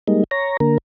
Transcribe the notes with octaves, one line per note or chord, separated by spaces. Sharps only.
G3 G#3 A#3 D#4
C#5 A#5
D3 A#3 A#4